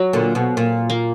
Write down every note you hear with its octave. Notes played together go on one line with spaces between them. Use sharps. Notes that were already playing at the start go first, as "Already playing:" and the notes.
Already playing: F#3
A#2 D3
B2
A#2
A#3